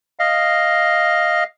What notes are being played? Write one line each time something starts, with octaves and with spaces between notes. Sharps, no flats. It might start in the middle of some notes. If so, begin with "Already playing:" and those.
D#5 F5